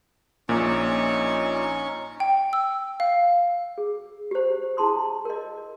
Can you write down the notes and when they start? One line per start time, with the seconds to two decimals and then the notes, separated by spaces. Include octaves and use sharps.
0.49 A#1 A#2 C#4 D#4 C#6
2.20 G5
2.53 E6
3.00 F5
3.78 G#4
4.31 G4 C5
4.77 E4 G#4 A5 C6 D#6
5.25 A#4 D#5